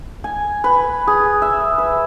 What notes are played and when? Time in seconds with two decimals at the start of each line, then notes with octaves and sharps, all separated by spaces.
0.24 G#5
0.64 B4
1.07 G#4
1.42 E5
1.78 B4